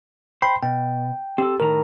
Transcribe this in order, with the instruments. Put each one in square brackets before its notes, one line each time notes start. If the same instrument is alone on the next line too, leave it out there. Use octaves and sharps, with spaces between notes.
[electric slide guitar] C5 [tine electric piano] G5 B5
[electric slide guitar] B2 [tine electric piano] G5
[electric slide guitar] C4 A4 [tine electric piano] G4
[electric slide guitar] A2 D#3 A#5 [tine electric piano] A#4